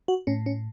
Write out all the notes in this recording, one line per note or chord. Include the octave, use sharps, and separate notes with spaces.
F#4
A2 C#4
C#4